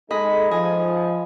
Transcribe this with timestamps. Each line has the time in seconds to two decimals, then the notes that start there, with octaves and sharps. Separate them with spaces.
0.10 G#3 D#4 G#4 A4 D#5 B5
0.51 F3 D#5 G#5